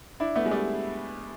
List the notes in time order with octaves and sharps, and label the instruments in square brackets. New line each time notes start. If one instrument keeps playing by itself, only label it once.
[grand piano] D4 E4
A3 B3
G#3
G3 A3